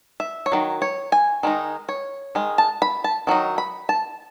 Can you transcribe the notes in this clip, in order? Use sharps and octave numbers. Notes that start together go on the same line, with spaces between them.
E5
C#5
D#3 F#3
C#5
G#5
D#3 G#3 D#4
C#5
D#3 G#3
A5
B5
A5
D#3 F#3 D#4
B5
A5